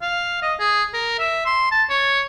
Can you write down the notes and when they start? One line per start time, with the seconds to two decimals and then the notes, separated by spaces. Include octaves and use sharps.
0.01 F5
0.42 D#5
0.59 G#4
0.93 A#4
1.19 E5
1.46 C6
1.71 A5
1.89 C#5